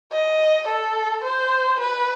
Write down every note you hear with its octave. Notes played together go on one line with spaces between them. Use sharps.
D#5
A4
C5
B4